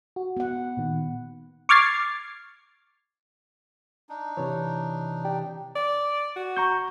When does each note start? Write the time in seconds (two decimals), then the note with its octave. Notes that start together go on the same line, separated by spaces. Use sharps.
0.16 F#4
0.37 B3 F#5
0.77 A#2 D#3
1.69 C#6 D6 F6 G#6 A6 C7
4.09 D4 D#4
4.37 C3 E3 C#5
5.25 G4 D5 G5
5.75 D5
6.36 F#4
6.57 A#5 C#6 G6